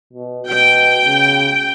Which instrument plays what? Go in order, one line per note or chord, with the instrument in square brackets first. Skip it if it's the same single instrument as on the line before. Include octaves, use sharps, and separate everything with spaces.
[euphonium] B2
[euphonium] B2 [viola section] G5
[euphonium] C#3